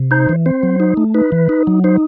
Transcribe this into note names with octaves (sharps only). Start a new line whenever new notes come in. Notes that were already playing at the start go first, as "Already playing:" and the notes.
Already playing: C3
D#4 C5
E3
C4 C5
F#3
D#4
A3
D#4 B4
E3
D#4
F#3
D#4 C5